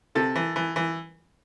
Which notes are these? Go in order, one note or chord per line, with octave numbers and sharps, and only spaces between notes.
C3 A4
E3
E3
E3